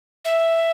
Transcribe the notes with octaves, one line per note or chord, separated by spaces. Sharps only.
E5